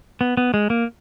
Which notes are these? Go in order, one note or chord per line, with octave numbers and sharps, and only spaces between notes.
B3
B3
G#3
A#3